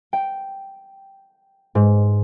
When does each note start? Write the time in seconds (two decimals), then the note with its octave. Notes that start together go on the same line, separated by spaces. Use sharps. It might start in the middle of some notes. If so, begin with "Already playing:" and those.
0.13 G5
1.75 G#2